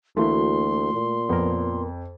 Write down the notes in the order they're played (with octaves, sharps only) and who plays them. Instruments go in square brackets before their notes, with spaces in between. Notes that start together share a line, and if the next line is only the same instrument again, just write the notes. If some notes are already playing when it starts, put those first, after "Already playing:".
[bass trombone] D2 [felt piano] E3 E4 F#4 [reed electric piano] A3 A#3 [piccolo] C6
[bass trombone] A#2
[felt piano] F2 [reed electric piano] B3 A#4